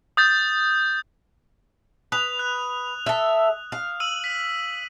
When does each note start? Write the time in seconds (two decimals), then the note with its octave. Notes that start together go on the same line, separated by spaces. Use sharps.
0.17 D#6 G6 A6
2.12 B4 D#6 F7
2.39 F#6
3.06 A4 E5
3.72 F5
4.00 E6 D#7 F#7
4.24 B6